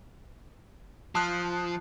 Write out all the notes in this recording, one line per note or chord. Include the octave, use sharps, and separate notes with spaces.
F3 A5 D#6 F#6